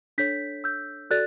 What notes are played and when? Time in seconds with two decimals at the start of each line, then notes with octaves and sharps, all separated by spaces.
0.18 D4 A4 C#5 G6 B6
0.64 E6 G6
1.10 F#4 A4 D5 F#6 A6